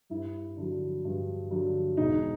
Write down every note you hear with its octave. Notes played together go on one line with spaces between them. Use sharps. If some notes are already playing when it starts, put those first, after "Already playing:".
G2 E4
D3 F#3
G2
D3 F#3
E1 D#4